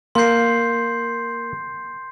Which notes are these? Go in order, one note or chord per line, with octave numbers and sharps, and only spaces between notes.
A#3 C6 G6 C7